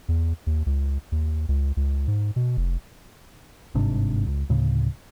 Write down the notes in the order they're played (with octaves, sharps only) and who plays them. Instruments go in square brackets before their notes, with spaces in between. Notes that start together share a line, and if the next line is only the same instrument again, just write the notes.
[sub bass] E2
D#2
C#2
D#2
C#2
C#2
G#2
B2
F1
[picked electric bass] G1 G#2 C3 D4
C#2
D2 A2 C#3